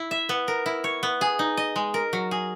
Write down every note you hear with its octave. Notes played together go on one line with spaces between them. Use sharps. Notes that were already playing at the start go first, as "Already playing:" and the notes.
Already playing: E4
E5
B3
A#4
E4
C#5
B3
G#4
D#4
D#5
G#3
A#4
F#3
G#4